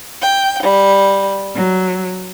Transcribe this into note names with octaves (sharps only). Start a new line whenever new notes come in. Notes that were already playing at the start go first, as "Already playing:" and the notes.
G5
G3
F#3